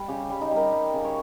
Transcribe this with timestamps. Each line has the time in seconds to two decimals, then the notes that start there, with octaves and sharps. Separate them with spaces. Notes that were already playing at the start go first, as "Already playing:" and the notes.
Already playing: G3
0.08 C#3 G4
0.30 G3
0.41 D#4
0.51 G3
0.56 A#4
0.72 G3
0.94 C#3
1.05 C#5